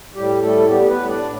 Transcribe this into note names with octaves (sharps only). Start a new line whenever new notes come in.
A2 G3 G4
G3 A3 A4
E4
G3 B3 G4
B3 B4
A2
D4 D5
A2